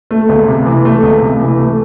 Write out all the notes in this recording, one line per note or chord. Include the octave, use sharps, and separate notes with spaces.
A3
C#2
C3
E3
A3
C#2
C3
E3
A3